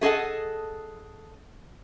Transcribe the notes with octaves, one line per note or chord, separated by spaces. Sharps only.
A3 G#4 A4 D#5 F#5